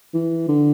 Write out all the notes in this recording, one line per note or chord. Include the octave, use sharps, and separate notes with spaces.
E3
D3